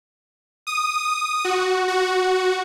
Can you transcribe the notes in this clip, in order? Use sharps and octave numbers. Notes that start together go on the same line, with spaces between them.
D#6
F#4
F#4